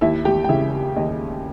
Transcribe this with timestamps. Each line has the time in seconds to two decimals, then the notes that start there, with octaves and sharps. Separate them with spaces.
0.01 D#2 E4 E5
0.25 G4 G5
0.44 G5
0.49 C#3 E4 E5
0.96 D#2 D#5